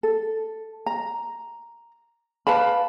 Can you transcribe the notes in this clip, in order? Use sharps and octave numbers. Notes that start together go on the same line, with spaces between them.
A4
A#5
B4 F5 A5 B5